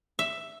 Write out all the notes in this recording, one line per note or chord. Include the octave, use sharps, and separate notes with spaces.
E5